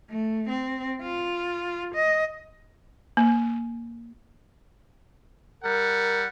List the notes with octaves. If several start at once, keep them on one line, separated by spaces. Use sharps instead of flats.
A3
C4
F4
D#5
A#3
G3 A#4 F#5